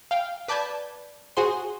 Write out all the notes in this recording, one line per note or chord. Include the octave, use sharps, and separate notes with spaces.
F5 G5
B4 D5 A5 G6 G#6 B6
F#4 G#4 C5 C6